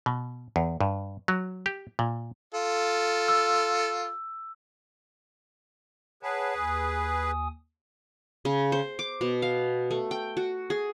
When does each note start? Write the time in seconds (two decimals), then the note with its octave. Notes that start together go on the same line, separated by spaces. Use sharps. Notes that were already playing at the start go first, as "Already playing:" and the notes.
0.06 B2
0.56 E2
0.81 G2
1.28 F#3
1.66 G4
1.99 A#2
2.54 F4 A4
3.28 E6
6.23 G#4 B4 C#5 F#5 A5
6.56 D#2 G#5 D#6
8.45 C#3
8.72 C5
8.99 D6
9.21 B2
9.42 F5
9.91 A3
10.11 G5
10.37 F#4
10.70 G#4